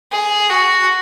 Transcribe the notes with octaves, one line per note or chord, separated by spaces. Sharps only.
G#4
F#4